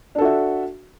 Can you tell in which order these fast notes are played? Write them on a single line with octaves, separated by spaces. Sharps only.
D4 A4 F#4 E5